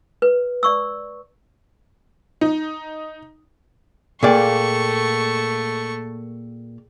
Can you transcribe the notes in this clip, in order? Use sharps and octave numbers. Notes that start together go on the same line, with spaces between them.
B4
D5 C#6 E6
D#4
A#2 A3 A#3 G#4 D5 G5 C#6